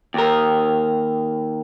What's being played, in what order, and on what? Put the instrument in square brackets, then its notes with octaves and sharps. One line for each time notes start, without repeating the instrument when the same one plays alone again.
[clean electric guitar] D#2 A#4